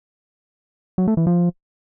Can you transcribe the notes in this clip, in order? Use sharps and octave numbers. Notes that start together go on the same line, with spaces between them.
F#3
A3
E3
F3